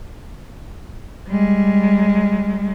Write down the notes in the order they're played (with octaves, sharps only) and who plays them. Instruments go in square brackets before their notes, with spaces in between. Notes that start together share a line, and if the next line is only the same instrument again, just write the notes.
[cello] G3 G#3